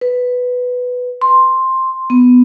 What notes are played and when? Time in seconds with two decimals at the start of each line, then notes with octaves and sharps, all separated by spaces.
0.01 B4
1.21 C6
2.10 B3